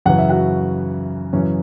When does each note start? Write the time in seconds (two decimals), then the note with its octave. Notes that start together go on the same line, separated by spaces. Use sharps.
0.06 F#2 C#3 E3 F#5
0.18 E5
0.30 F#4 F#5
1.33 F#2 C#3 E3 C#4 C#5